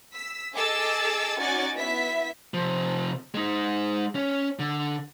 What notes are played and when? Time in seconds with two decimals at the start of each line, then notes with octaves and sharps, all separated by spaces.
0.15 E6 B6
0.54 G#4 A4 D#5 D6 E6 A6
1.40 C#4 D#4 F#4 D5 G#5 A6
1.76 B3 E4 E5 B6
2.54 C3 F3
3.35 G#3 D#4
4.15 C#4
4.59 D3